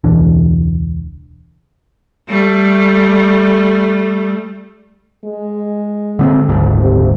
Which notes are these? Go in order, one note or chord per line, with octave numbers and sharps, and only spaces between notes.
E1 C#2 E3 D4
G3 A3
G#3
D3 B3 C4
F#1 D2 G#2
C3